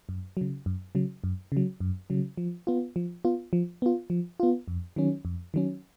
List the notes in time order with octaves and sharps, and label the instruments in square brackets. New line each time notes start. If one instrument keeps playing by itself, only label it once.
[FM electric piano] F#2
C#3 F#3
F#2
C#3 F#3
F#2
C#3 F#3
F#2
C#3 F#3
F3
B3 F4
F3
B3 F4
F3
B3 F4
F3
B3 F4
F2
D#3 F#3 C#4
F2
D#3 F#3 C#4